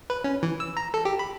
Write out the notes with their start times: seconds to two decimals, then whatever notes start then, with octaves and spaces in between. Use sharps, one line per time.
0.10 B4
0.24 C#4
0.43 E3
0.60 E6
0.77 A#5
0.94 A4
1.05 G4
1.19 B5